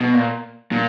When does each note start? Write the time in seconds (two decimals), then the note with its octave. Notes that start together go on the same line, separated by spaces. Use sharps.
0.01 B2
0.13 A#2
0.72 A#2